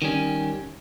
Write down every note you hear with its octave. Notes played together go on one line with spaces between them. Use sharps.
D#3 G3 C#4